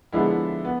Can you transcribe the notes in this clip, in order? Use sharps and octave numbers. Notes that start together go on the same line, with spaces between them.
D3 F3 G#3 B3 E4
B3